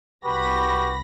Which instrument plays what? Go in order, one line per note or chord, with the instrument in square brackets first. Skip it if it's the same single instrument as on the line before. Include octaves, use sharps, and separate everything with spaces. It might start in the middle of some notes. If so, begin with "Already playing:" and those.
[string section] C2 B5 A#6 [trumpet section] F#4 G4 B4